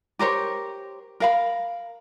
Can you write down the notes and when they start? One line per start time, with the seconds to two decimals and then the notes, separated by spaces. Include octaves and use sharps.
0.19 G4 A#4 C5 C#5
1.20 A#4 F5 B5